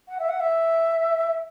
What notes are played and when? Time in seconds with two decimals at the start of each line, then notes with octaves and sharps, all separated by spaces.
0.08 F#5
0.19 E5
0.29 F#5
0.40 E5